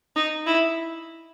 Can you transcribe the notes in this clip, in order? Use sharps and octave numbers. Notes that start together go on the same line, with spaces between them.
D#4
E4